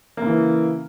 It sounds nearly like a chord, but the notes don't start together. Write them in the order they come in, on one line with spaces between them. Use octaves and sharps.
A#3 C#3 E3